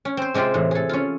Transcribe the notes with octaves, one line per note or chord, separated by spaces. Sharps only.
C#4
C4 C5
C3 G#3 C4 F4 G4
A2 E3
G#4 A4
C#4 F4